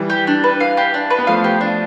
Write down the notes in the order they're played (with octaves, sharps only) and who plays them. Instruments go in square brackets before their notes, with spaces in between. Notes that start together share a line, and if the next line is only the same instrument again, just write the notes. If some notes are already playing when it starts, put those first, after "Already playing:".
Already playing: [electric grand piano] E3 G3
[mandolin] G4
D4
B4
F5
G4
D4
B4
[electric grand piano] B3
[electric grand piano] F3 A3 [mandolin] F5
[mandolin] G4
D4